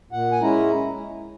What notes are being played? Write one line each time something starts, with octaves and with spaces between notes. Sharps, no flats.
A#2 F#5
G#5
G#3 C#4 E4 A#5